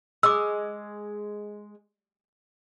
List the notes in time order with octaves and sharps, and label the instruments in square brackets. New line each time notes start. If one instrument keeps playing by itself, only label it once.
[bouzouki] G#3 [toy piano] D6 E6